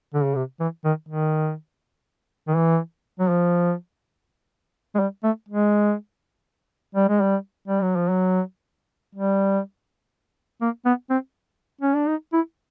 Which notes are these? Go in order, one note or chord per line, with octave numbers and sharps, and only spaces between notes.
D3
C#3
C3
E3
D#3
D#3
D#3
E3
F#3
F3
G#3
G3
A3
G#3
G3
G#3
G3
G3
F#3
F3
F#3
G3
A#3
B3
C4
C#4
D4
D#4
E4